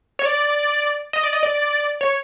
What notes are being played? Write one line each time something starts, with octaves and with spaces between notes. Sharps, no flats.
C#5
D5
D#5
D5
D#5
D5
C#5